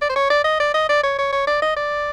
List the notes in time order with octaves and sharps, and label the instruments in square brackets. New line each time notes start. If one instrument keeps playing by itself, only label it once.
[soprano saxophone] D5
C5
C#5
D5
D#5
D5
D#5
D5
C#5
C#5
C#5
D5
D#5
D5